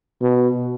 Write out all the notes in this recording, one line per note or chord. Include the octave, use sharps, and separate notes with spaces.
B2